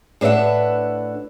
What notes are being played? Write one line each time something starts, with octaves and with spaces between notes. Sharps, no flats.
A2 D4 B4 E5 F#5